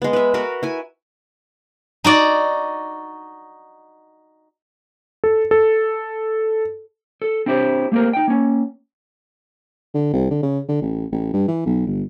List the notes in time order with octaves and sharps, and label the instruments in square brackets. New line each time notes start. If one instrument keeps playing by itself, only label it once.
[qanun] G#3 B3
B4 E5
F#4 A#4 B4
E4 G#5
[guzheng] D#4 F#4 D5
[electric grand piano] A4
A4
[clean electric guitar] A4
C4 D4 E4 G4 C5
A3 A#3 C4 G4 A#4
D#4 G5
A#3 C#4
[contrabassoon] D3
C2
D3
C#3
D3
A1
A1
G2
E3
B1
G1